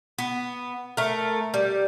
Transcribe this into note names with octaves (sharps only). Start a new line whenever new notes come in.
B3
A3 A#4
G3